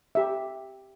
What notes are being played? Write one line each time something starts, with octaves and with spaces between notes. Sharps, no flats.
G4 E5